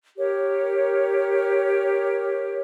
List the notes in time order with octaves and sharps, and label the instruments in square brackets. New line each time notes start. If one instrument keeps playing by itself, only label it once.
[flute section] G4 A#4 C#5